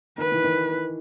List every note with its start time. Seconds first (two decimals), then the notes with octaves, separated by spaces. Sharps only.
0.18 D#3 B4
0.32 E3
0.44 D#3